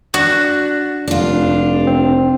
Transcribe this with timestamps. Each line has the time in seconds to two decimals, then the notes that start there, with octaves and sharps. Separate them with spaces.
0.14 D4 F#4
1.08 F1 D4 F4
1.87 C4